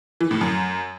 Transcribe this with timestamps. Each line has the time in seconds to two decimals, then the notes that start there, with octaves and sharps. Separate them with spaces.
0.21 E3
0.31 A2
0.41 F#2